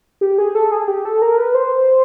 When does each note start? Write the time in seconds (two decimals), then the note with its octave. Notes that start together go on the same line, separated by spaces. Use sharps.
0.21 G4
0.38 G#4
0.55 A4
0.72 G#4
0.88 G4
1.05 A4
1.22 A#4
1.38 B4
1.55 C5